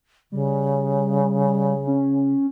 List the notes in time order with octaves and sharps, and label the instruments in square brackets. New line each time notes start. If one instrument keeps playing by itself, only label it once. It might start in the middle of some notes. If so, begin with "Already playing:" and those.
[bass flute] C#3 [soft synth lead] G3
[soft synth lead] C#4